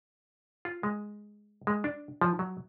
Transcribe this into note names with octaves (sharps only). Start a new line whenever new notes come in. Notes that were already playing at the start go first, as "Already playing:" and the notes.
F4
G#3
G#3
D4
F3
F#3